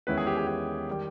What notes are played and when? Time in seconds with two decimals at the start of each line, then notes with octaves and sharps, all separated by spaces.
0.07 E2 D#3 G#3 C#4 E4 B4
0.17 G#4
0.27 G4
0.37 G#4
0.47 G4
0.89 D#3 G3